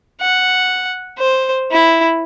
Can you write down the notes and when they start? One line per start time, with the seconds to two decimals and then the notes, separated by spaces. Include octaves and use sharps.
0.21 F#5
1.18 C5
1.71 E4